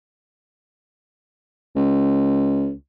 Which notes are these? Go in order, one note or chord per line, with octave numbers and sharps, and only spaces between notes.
C#2